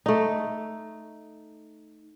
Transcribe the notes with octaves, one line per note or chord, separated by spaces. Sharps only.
A3 D#4